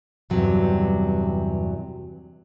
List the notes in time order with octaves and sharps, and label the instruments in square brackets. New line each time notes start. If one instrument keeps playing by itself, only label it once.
[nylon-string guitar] E2 G2 C3 F#3